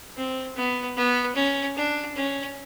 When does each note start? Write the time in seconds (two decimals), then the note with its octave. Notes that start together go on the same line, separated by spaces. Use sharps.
0.18 C4
0.57 B3
0.97 B3
1.36 C#4
1.76 D4
2.16 C#4